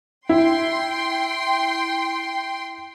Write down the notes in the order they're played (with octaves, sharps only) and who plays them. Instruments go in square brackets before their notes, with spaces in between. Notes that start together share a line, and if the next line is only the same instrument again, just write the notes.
[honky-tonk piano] E4 [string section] G5 C6